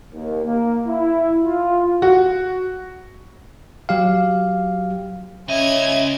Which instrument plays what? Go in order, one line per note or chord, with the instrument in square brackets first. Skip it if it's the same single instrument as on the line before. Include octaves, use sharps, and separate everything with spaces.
[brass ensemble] D#2
A#3
E4
F4
[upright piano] F#4
[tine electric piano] F#3 G4 F5
[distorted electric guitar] C#3 D#5 [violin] C#4 G#6 [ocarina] E5